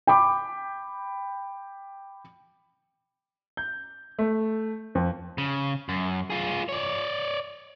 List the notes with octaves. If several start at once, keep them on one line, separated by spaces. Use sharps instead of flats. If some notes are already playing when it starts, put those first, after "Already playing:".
G5 B5 D6
G6
A3
F2
C#3
F#2
F4 G#4
C#5 D5